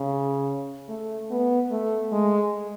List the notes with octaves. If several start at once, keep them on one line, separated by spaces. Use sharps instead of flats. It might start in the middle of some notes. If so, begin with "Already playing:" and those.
Already playing: C#3
A3
B3
A3
G#3